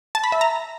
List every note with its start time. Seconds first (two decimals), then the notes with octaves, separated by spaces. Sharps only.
0.15 A5
0.24 B5
0.32 E5
0.41 A#5